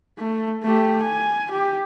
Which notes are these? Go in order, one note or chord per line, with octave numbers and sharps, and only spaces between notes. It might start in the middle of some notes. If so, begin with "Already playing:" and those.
A3
A3 G4
G#5
G4